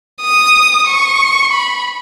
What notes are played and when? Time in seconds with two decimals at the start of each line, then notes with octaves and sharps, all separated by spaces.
0.22 D#6
0.87 C#6
1.52 B5